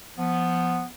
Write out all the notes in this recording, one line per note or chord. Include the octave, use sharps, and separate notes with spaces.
F3 B3